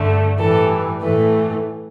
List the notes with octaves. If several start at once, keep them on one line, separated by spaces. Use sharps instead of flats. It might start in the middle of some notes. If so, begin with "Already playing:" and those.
Already playing: G2 D3 A3
A2 E3 G3 A4
A2 E3 A3 B4